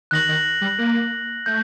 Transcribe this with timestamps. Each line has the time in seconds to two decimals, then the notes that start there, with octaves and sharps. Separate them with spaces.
0.11 D#3 F#6 A#6 F#7
0.29 D#3
0.61 G3
0.78 A#3
1.46 A3 G6